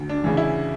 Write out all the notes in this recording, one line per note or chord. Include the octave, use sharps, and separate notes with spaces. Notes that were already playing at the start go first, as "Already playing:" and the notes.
Already playing: D2
D4
C#3 E3
E4